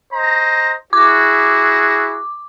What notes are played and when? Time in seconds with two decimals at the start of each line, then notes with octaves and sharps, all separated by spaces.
0.13 C5 D#5 A#5
0.93 E4 F#4 G#4 D6